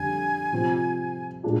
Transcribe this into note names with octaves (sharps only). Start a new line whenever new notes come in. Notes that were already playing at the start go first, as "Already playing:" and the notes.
Already playing: F2 D3 G3 G#5
C3 F3 C4 F4
A#2 G#3 D4 F4